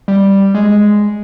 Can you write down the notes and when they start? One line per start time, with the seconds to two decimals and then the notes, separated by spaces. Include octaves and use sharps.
0.08 G3
0.54 G#3